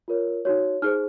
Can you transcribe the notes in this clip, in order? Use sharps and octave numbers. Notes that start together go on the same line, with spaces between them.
F4 A#4 C#5
D#4 F#4 C#5
D#4 G#4 C5 F6